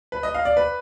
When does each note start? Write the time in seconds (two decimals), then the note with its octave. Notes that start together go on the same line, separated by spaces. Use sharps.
0.12 B4
0.23 D#5
0.34 F5
0.45 D5
0.57 B4